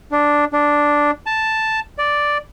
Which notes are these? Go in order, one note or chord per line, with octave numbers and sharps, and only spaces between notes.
D4
D4
A5
D5